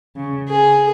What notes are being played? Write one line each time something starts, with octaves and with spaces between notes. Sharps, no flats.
C#3
G#4